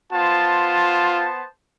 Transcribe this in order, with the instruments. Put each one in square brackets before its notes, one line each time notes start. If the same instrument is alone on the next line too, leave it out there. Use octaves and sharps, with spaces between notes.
[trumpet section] B3 C5 A5 [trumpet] F4